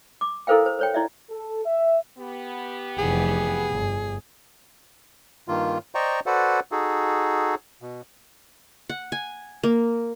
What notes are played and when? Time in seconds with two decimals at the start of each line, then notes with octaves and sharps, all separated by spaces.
0.21 D6
0.47 E4 A4 A#4 C5 F5 G5
0.66 C5
0.79 C5 C#5 G5
0.94 E4 D5 E5
1.30 A4
1.65 E5
2.18 B3 G4
2.98 F1 E3 G#4
3.72 G1
5.48 G2 D#3 A#3 F4
5.95 C5 D5 D#5 G5 A#5 C#6
6.26 F#4 A4 B4 C5 D5 F#5
6.72 D#4 F#4 G#4 A4
7.82 B2
8.89 F#5
9.12 G#5
9.63 A#3